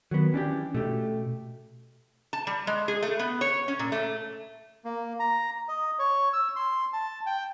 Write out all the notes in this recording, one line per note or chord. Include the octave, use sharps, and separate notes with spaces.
D#3 F#3 B3
E3 C#4 D4 G4
B2 A3 G4
A5
G3
G#3
G#4
A3
B3
C#5
C#4
A#2
A3
A#3
A#5
D#5
C#5
E6
C6
A5
G5